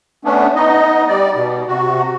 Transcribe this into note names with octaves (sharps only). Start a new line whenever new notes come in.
A3 B3 C#4 D4
B3 D#4 D#5
G3 D5
B2
C3 F#4